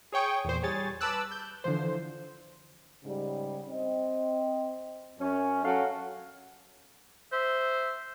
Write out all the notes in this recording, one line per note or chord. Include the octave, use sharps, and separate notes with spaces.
G#4 C#5 G5 C#6 D#6
E2 A#2 C5
G3 G#4 C#5 G#5 A6
B4 A5 D6 E6 F#6
G6
D3 E3 F3 C5
G#2 C#3 G3
C4 D#5
F#2 C#4
F#3 C#4 A4 F5 F#5
C5 E5